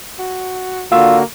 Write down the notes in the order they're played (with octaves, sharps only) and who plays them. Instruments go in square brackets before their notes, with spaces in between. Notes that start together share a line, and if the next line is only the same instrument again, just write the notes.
[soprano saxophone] F#4
[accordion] D3 F#4 [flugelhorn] A#3 [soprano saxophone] F4 [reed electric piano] F5 E6